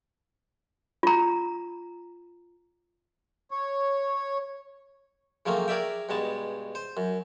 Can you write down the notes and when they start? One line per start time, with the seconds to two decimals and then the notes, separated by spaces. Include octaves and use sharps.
1.03 F4 A#5
3.51 C#5
5.46 C#3 F3 F#3 A3 A#3 C4
5.68 G#4 A#4 D5 E5 G5
6.09 G2 B2 G#3 A5
6.75 C5
6.97 F#2